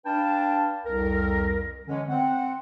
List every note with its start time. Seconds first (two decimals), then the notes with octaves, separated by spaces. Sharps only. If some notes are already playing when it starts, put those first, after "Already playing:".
0.06 D4 B4 F5 G5 A5
0.85 C2 F2 A#4
1.88 D3 E3 G#3 C#4
2.09 C4 F#5